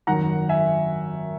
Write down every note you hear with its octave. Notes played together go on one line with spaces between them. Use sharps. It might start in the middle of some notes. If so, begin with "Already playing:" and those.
G#1 F#2 D#3 F#5 A#5
E5 G#5